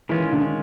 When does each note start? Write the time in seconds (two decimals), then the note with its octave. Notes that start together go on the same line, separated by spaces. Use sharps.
0.09 D#3 E3 G#3 C#4 F4
0.32 D3